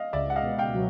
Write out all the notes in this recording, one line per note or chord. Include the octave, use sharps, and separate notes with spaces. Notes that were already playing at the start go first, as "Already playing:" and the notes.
Already playing: D#5 F5
C#2 D5 E5
F#5
D#5 F5
B2
F5 G5
F#3